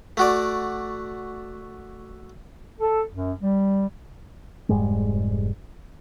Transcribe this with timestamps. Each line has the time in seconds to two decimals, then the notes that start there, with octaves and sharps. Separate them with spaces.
0.17 A3 F#4 D5
2.81 A4
3.14 F#2
3.41 G3
4.69 F1 G#2 G3 G#3